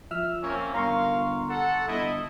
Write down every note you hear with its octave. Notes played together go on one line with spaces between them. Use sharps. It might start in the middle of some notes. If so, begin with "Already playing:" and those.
F3 E5 E6 F6
A#3 C4 C#4
G1 A#4 F5 A#5 C6 C#6
A4 F#5
G1 E4 D#5